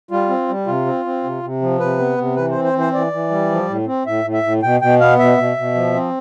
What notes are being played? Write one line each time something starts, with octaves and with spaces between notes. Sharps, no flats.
G3 F4
C4
G3
C3 F4
C4
C4
C3
C3
F3
C3 B4
B3
C3
E3 B4
C5
C4
C5
E3
C5
E3 D5
E3
G3
F3
A2
C4
A2 E5
A2
E5
A2
B2 G5
B2 G5
B3 F5
B2 E5
B2
B2
F3
C4